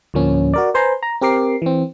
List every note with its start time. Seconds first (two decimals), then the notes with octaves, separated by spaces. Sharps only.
0.14 D2 A2 F3 A#3 C#4
0.54 F#4 A#4 D5
0.74 B4 C5 G#5 A#5 C6
1.03 A#5
1.21 C4 G4 A#4 D6 C7
1.62 E3 C4